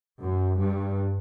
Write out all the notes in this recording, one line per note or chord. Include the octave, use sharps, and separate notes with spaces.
F#2
G2